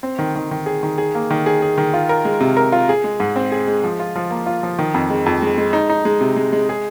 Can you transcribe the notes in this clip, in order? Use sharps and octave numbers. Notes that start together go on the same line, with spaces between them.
C4
D#3
D#3
D#3
G#4
D#3
G#4
A#3
D#3
G#4
G#4
D#3
F4
A#4
G#3
C3
A#4
F4
G#4
G#3
G#2
C4
G#4
G#3
F3
F4
F3
A#3
F4
F3
D#3
F2
G#3
F2
G#3
G#3
D#4
D#4
G#3
C3
G#3
G#3
G#4